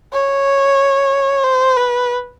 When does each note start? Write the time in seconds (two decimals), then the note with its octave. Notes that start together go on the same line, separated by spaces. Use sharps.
0.13 C#5
1.44 C5
1.77 B4